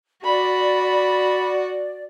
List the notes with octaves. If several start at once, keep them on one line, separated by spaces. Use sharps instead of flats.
F#4 D5 B5